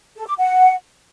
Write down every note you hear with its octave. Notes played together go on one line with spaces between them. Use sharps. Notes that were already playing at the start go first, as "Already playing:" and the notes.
A4
D6
F#5